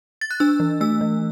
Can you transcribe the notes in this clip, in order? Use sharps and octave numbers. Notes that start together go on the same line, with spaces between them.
A6
F#6
D4 E6
E3
A3 E6
E3